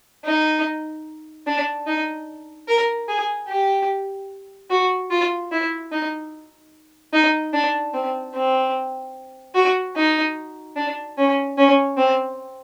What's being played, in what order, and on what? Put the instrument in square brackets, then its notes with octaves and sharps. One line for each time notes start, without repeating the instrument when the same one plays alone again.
[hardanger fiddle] D#4
D4
D#4
A#4
G#4
G4
F#4
F4
E4
D#4
D#4
D4
C4
C4
F#4
D#4
D4
C#4
C#4
C4